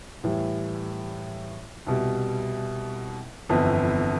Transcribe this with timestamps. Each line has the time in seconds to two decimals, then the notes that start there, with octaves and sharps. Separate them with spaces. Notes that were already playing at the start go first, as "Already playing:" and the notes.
0.24 A2 E3 G3
1.87 C2 B2 G3
3.49 G1 F2 E3 B3